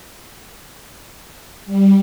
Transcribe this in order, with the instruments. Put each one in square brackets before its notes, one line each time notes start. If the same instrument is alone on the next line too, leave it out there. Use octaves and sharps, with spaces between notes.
[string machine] G3